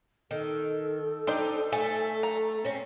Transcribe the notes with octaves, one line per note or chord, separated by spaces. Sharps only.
D#3 A4
D4 D#4 G4 C5
A3 G#5
A#5
C4 C#4